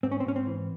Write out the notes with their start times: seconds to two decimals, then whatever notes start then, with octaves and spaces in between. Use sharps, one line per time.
0.03 G#2 C4
0.12 C#4
0.20 C4
0.26 G#2 C#4
0.36 C4
0.47 E3